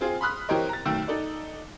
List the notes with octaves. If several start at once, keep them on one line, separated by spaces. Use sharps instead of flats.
C4 F4 G#4
B5 C6 D#6 F6 F#6 B6
E3 C4 G4 A#4 C#5 D#5
A#5 A6
B1 D#3 A3 G5 E6
D#4 A4 D5